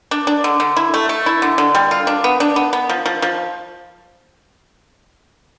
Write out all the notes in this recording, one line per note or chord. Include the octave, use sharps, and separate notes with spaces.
D4
D4
D3
D3
E4
A3
A3
E4
D3
D3
G3
F4
D4
B3
D4
B3
B3
F3
F3
F3